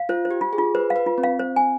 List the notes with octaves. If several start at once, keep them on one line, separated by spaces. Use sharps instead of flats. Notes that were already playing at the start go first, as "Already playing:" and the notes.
Already playing: F5
F4 C5
C5
G4
F4
G#4
F4
B4 C5
F5
B4
F4
C4
F5
C5
G#5